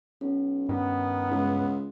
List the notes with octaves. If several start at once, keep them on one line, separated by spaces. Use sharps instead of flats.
B1 C#4
G2 D#3 B3
C#2